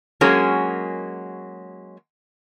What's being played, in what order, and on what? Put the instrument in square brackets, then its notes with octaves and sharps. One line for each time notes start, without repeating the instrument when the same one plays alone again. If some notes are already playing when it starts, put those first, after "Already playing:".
[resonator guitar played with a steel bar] F#3 G#3 A#3 C#4 G#4 A#4